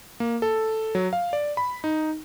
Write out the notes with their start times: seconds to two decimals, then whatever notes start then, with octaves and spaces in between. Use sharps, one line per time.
0.20 A#3
0.42 A4
0.95 F#3
1.13 F5
1.33 D5
1.57 B5
1.84 D#4